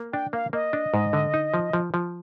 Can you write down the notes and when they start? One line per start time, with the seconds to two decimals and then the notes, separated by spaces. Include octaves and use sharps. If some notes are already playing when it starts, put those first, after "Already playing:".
Already playing: A#3
0.13 D4 G5
0.33 A#3 F5
0.53 A#3 D#5
0.73 D4
0.94 G#2
1.13 D3
1.34 D#4
1.54 F3
1.73 F3
1.94 F3